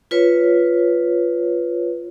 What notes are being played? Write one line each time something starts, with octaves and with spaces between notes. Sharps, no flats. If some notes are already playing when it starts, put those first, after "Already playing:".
F4 B4 C#5